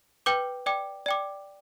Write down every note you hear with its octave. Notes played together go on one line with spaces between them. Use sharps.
B4 G5 D6 G6
D5 G5 D6
D5 G5 D6